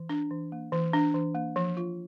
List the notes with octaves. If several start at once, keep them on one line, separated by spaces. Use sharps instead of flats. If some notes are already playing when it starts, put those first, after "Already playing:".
Already playing: E3
D4
E3
A#3
E3
D4
E3
A#3
F3
F4